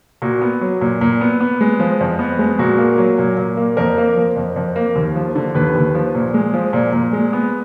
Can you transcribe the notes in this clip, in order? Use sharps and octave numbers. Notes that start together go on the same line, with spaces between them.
A#2 F#4
B3
F#3
A#2
A#2
B3
B3
G#3
F3
F2
B3
G#3
A#2 F#4
A#3
F#3
A#2
A#2
A#3
F2 A#4
A#3
F3
F2
F2
A#3
D#2
F3
D3
D#2 B4
D#2
F3
A#2
G#3
F3
A#2 D5
A#2
G#3
B3